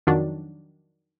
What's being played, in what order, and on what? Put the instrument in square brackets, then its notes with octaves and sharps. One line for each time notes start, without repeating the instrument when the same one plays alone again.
[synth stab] F2 D#3 F#3 D4